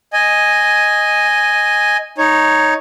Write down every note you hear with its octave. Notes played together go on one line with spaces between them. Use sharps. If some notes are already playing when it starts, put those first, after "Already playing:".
D#5 G#5
D#4 C#5